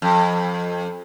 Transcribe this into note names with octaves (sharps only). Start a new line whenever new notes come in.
F2